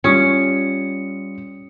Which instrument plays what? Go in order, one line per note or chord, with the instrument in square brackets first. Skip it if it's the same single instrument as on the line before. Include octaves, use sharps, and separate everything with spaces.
[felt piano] G3 F4 [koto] C#4 [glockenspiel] D#6 C#7